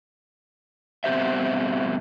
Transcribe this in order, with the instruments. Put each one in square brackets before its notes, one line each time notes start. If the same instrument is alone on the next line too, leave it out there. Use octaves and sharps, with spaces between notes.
[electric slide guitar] G2 B2 C4 G4 C5 E5